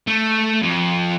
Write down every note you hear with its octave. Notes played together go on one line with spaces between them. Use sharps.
A3
F2